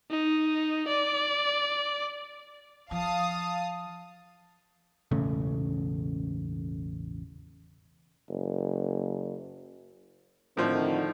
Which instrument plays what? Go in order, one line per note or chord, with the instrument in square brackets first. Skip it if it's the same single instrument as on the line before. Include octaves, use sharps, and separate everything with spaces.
[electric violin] D#4
D5
[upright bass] F3 [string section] F5 A5 D#6
[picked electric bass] E1 A1 C#3 A3
[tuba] F#1
[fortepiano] A2 F3 [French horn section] D3 D#3 C4